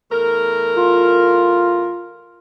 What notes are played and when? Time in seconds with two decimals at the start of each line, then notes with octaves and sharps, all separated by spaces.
0.11 E2 A3 A#4
0.77 F4